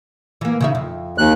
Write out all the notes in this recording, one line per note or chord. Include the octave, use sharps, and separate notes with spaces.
E3 A#3
C#3 D#4 E5
F2
D#2 F#6